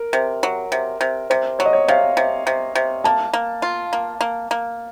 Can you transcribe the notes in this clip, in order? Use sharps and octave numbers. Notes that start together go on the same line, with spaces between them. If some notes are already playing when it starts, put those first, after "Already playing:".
Already playing: A#4
C3
F#3
C3
C3
C3 C5
F#3 C#5
D#5
C#5
C3 F5
C3
C3
C3
A#3 A5
A#3
F4
A#3
A#3
A#3